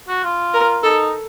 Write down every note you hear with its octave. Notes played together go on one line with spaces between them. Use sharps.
F#4
F4
A#4
D#4 A4